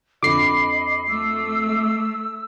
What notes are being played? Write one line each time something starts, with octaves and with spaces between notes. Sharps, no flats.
F2 D3 D#5 B5 D6 C7
A3 E6